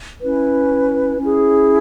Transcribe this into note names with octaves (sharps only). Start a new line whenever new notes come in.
C#4 E4 B4
C#4 E4 G#4